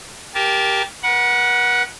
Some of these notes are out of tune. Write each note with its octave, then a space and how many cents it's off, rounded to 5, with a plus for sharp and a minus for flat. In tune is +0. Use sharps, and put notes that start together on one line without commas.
G4 +0 A#4 +5 A5 -25
B4 -45 F#5 +0